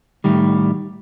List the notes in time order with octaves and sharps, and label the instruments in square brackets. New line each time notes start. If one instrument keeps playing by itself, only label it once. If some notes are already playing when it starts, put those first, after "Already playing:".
[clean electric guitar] A2 D#3 G3